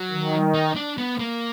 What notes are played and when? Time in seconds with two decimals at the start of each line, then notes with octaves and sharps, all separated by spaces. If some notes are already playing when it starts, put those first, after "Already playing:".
Already playing: F#3
0.10 D#3
0.54 D#4
0.76 D4
0.98 B3
1.20 A#3